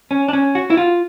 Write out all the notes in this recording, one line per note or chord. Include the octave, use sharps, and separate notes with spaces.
C#4
D4
C#4
F#4
E4
F4